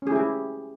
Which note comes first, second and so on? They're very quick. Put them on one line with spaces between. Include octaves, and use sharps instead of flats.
C#4 G#4 E4 G4